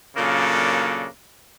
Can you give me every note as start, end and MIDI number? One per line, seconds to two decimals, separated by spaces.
0.17 1.06 46
0.17 1.06 49
0.17 1.06 54
0.17 1.06 58
0.17 1.06 62
0.17 1.06 69